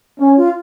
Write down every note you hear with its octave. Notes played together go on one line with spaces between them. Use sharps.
C#4 C#5
F4